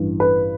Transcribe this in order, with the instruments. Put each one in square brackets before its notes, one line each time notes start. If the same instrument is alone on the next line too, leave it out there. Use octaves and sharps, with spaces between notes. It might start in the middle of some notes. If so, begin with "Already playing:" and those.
Already playing: [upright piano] A1 G2 E3
B4